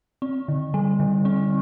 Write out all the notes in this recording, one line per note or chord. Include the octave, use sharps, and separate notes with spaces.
C4
D3
G3
D3
C4